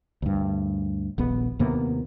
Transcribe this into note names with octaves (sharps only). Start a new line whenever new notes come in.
D2 G2
D#1 A#1 B3
D#2 C3 A#3 B3